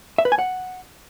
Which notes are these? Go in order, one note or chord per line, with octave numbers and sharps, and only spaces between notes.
E5
B4
G#5
F#5